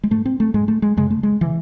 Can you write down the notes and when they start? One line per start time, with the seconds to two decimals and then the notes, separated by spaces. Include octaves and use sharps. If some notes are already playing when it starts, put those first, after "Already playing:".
0.04 G#3
0.11 G#2 A3
0.26 C4
0.40 A3
0.54 G#2 G#3
0.68 A3
0.82 G#3
0.97 F#2 C#3 G#3
1.10 A3
1.23 G#3
1.41 C#3 E3